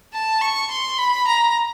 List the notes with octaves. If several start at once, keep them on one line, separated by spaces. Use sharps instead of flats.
A5
C#6
C6
B5
A#5